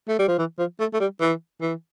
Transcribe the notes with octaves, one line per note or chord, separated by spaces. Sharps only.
A3
G3
F3
E3
F3
A3
A3
G3
E3
E3